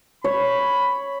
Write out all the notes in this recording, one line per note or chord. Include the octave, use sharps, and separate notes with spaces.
C#5 B5